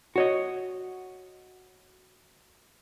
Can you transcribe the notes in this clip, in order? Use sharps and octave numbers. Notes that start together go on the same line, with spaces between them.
F#4 C#5 D#5